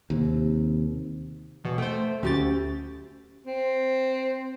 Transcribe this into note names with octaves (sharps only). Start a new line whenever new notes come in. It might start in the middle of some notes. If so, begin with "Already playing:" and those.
D#2 C3
E2 B2 B3
A3 C5 G5
D2 C#4 F#4 G4 A6
C4